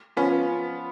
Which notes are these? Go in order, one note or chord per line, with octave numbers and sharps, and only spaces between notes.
F3 B3 C#4 F4